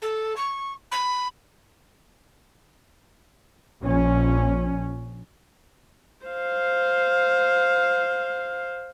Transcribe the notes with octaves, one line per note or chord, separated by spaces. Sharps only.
A4
C#6
B5
A#1 C#4
C5 F5